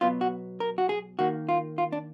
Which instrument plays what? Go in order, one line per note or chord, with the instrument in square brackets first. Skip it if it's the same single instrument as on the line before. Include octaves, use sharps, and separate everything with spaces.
[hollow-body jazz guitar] B2 F#3 B3 F4
F#4
A#4
F#4
G#4
D#3 A#3 F#4
F4
F4
D4